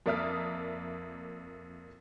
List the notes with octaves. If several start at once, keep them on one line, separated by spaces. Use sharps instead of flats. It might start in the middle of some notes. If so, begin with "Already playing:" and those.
F2 A#3 D5 E5 D#6 F6